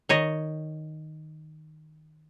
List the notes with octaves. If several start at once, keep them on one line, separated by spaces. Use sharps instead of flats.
D#3 C#5 D#5